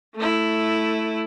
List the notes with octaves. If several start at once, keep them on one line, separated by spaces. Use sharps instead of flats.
A3 E4